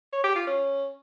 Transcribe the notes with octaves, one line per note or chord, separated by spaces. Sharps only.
C#5
G4
F4
C#4